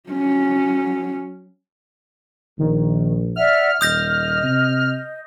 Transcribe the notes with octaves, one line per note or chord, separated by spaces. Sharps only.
F#3 C#4
A#1 D#3
D5 E5 F#5 F6
D#1 D#5 D#6 G6 A#6
C3